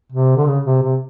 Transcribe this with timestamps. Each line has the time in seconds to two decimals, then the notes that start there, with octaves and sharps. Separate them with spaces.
0.12 C3
0.36 D3
0.48 C#3
0.65 C3
0.83 C3